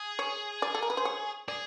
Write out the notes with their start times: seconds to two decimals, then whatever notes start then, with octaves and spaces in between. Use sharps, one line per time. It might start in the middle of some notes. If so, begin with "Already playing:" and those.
Already playing: G#4
0.19 C#5
0.62 D5
0.75 A4
0.83 A#4
0.90 B4
0.97 C5
1.05 C#5
1.48 G#4 D5